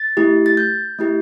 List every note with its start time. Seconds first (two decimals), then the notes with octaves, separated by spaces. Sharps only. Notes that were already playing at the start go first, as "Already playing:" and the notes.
Already playing: A6
0.17 A3 E4 G4
0.46 A6
0.57 G6
0.99 A3 E4 G4